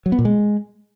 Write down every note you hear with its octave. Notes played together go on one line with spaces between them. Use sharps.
F#3
B3
A#2
G#3